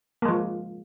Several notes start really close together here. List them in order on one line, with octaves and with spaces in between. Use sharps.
A#3 G#3 F3